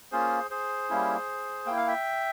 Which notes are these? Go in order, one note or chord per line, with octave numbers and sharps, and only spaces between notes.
A#3 C#4 F4 G#4 C5
G#4 C5
G3 A#3 C#4 E4
A#3 E4 G5
F5
E5 G5